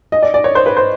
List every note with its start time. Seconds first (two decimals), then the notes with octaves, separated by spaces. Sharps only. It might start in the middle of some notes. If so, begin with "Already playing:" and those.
0.12 D#5
0.22 D5
0.34 D5
0.44 C#5
0.55 C5
0.66 B4
0.77 C5